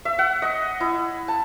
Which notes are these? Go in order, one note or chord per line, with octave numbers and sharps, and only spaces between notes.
E5
F#5
D#5
E4
A5